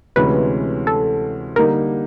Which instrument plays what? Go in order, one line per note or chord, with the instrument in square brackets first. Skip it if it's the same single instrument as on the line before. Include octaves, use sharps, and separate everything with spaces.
[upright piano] D2 C3 E3 G#3 C#4 [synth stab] B4
[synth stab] A4
[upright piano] D3 G3 A#3 D#4 [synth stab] A#4